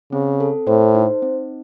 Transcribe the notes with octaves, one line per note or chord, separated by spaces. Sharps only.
C#3 C4
A4
A2 C5
D#4
C4